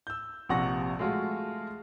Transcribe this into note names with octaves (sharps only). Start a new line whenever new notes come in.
E6 G6
A#1 C3 F3 F#5 C#6 A#6
G#3 A3 F4 F#4